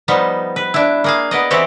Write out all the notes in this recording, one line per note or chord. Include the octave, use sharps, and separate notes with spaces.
F3 G3 B3 D#4
B4
D4 E4
A#3 G#4 F5
B3 D5 D#5
E3 B3 C4 F#4 G4